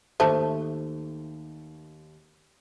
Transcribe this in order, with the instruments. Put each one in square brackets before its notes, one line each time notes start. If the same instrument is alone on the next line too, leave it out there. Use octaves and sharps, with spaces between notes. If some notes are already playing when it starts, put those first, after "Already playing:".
[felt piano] D#2 D#3 [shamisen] A3 [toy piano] C5 [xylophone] A5